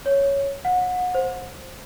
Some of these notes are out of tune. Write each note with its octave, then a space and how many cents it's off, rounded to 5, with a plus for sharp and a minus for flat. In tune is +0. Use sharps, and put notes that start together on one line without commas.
C#5 +0
F#5 -30
C5 +10